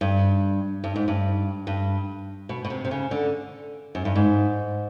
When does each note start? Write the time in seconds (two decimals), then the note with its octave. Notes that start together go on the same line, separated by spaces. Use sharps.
0.01 G2
0.84 G2
0.96 G#2
1.08 G2
1.67 G2
2.49 B2
2.65 B2
2.70 C3
2.85 C3
2.91 C#3
3.11 D3
3.95 F#2
4.05 G2
4.16 G#2